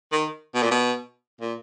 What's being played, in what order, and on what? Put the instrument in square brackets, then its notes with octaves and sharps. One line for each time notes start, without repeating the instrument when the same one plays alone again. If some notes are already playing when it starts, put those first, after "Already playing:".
[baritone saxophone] D#3
B2
A#2
B2
A#2